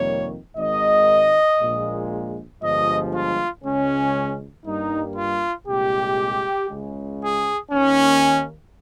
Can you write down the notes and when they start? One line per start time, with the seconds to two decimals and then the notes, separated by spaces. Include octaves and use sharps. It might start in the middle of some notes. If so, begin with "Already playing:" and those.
Already playing: F2 C3 D#3 G3 A#3 C#5
0.56 G#1 G#2 D#3 D#5
1.58 A#1 A#2 G#3
2.61 G1 G2 F3 G#3 D#5
3.12 F4
3.63 C#2 C#3 G#3 C#4
4.64 G2 G3 A#3 D#4
5.15 F4
5.66 C2 A#2 G#3 G4
6.69 C#2 C#3 G#3
7.20 G#4
7.71 D#2 D#3 A#3 C#4